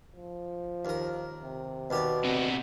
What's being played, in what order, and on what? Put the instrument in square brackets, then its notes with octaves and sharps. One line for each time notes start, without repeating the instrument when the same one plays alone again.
[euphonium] F3
[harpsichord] D#2 A#4
[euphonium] C3
[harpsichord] D#2 G4 D5 [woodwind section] B2
[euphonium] D2 [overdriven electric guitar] C3 B3